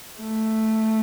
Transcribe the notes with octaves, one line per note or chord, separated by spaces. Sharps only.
A3